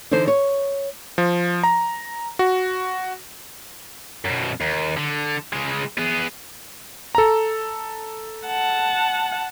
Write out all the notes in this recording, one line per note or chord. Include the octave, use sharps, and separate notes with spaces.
D3 E3 D#4 A4 C5
C#5
F3
A#5
F#4
F#2 B2
D#2
D3
C#3 G#3
B3 G#4
A4 A#5
F#5 A5